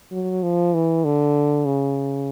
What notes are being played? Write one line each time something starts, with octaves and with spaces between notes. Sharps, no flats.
F#3
F3
E3
D3
C#3